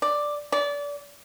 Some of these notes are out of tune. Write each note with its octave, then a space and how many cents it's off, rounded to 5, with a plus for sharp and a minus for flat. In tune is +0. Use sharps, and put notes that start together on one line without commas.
D5 +5
D5 -30